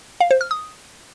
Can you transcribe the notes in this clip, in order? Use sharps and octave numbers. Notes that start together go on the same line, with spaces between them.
F5
C5
F6
D#6